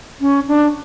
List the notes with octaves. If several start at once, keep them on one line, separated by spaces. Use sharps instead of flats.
C#4
D4